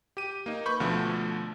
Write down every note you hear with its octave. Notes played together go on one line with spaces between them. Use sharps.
G4 D#7
A#3 D#4
B4 B5 C#6 G6
D2 B2 D3 F3 A3